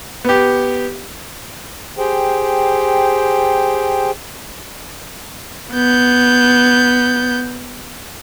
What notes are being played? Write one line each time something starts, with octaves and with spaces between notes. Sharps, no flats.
B3 G4
G4 G#4 C5 G5
B3 G6